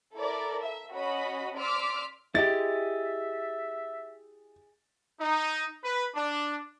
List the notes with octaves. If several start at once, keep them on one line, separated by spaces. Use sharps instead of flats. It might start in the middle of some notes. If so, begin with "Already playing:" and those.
E4 A4 A#4 D5
E5
C#4 F#4 D#5 B5
D5 C6 D6 E6 F6 B6
E4 G4 G#4 D#5 E5 A6
D#4
B4
D4